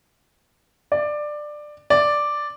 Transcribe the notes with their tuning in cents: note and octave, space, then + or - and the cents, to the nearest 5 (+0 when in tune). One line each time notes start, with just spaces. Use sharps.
D5 +15
D5 +0